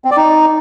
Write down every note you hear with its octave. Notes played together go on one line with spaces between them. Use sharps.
C4
D5
D#4